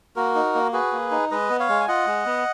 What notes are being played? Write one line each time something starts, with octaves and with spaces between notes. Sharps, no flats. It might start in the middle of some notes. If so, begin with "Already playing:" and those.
A#3 F#4 A#4
D#4
A#3
F#4 G#4 B4
A#3
D#4
G#3 B4 D#5
B3
C#5 F5
G#3
G#5
F4 D#5 F#5
G#3
B3